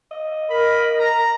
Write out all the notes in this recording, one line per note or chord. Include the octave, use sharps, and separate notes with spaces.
D#5
A#4 B5
A#5